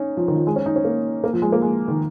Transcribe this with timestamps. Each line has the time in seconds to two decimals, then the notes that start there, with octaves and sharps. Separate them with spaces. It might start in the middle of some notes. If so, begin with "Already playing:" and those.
Already playing: C#4 D#4
0.17 F3
0.28 D#3
0.36 F3
0.47 G#3
0.56 C#4
0.66 D#4
0.76 C#4
0.85 A#3
1.24 A#3
1.33 F3
1.42 G#3
1.52 A#3
1.62 G#3
1.88 D#3